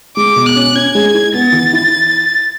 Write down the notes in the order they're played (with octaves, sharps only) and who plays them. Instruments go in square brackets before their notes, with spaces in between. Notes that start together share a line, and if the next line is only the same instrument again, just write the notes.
[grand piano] G#3 [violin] D6
[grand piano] B2
[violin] F#6
[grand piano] C#4
[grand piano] C#4 [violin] G#6
[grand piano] G#3
E4
[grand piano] B3 [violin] A6
[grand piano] E3
E4